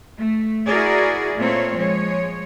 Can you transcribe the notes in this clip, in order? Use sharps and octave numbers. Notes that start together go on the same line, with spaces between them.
A3
E4 F#4 G#4 A#4 D5
A#2 A3 A#3 C4 C#5
F3 G#3 C#5